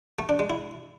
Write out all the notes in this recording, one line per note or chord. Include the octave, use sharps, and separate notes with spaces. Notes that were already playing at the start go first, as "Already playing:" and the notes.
A3
D4
G#3
E4